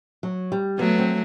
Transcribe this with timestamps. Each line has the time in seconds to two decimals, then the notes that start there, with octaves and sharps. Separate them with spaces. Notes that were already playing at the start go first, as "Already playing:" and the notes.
0.23 F#3
0.52 G3
0.79 F#3 A3 B3
0.98 C4